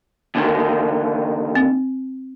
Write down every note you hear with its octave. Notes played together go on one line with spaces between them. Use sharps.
D#2 D3 D#3
C4